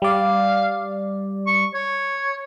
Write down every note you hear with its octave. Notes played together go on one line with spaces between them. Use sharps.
G3 D5 F5
C#6
C#5